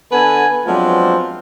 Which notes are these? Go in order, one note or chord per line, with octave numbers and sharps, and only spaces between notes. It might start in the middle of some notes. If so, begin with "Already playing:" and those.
D3 B3 A4 B4 G#5
F3 F#3 G#3 B3 C4 D4